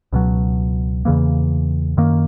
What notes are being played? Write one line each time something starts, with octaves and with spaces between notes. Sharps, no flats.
C#2 B2 F#3
E2 C#3 E3 A#3
F#2 D#3 A#3